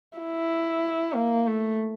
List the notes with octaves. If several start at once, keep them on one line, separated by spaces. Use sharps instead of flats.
E4
A#3
A3